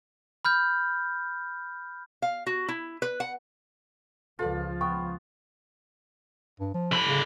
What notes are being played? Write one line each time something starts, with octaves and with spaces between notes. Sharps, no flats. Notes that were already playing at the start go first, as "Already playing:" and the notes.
B5 F6 G6
F5
F#4
E4
B4
F#5
C#2 F3 F4 A4 B4 D5
B3 G5 C#6
G2
F3
D3 B5
C#3